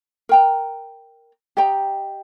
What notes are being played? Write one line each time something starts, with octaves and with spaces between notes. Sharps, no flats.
A#4 G5 A#5
G4 D#5 G5 A#5